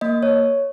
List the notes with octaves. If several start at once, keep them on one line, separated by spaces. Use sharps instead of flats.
A#3 D#5
C#5